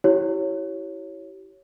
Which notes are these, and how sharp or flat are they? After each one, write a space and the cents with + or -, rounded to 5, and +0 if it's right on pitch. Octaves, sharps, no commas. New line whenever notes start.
E4 +0 G4 -30 C#5 +0